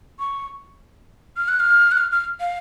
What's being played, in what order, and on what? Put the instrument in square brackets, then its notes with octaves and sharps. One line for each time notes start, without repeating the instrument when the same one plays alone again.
[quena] C#6
F6
F#6
F6
F#6
F6
F6
F5